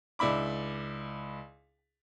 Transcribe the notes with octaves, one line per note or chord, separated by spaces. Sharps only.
C#2 D4 E4 B5 D6